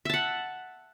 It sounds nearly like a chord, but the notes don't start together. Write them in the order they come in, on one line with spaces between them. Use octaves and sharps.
E5 A5 F#5